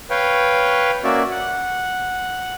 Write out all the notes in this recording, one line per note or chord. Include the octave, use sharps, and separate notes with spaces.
B4 C#5 F5 G5
A#3 C#4 F#4 D5 E5
F#5